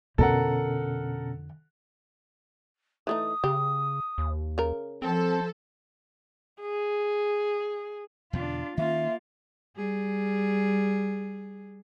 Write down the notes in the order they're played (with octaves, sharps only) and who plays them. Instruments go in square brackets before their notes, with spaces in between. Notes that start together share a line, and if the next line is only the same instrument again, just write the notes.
[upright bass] F2 D3 [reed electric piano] B2 C#4 [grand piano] A4 A#4 F#5
[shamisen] E3 A3 D#4 [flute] D#6
[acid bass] C#3 [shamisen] G4
[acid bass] D#2
[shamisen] C#3 A#4
[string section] F3 A4 [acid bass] C4 [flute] C5
[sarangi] G#4
[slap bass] E2 B2 D3 [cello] D4 F4
[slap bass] D#3 C#4 [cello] A#3 F4 [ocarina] E5
[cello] G3 G#4